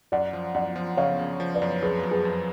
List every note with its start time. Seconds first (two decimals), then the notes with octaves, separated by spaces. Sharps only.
0.12 F#2 D5 F#5
0.33 F3
0.54 F#2 D5 F#5
0.76 F3
0.97 C#3 C#5 F5
1.19 C#3
1.40 F3
1.54 B4 D5
1.62 F#2
1.82 F2 G#4 B4
2.03 F#3
2.11 G#4 B4
2.25 F2